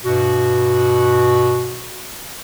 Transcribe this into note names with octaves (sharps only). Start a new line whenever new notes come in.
G2 B2 F#4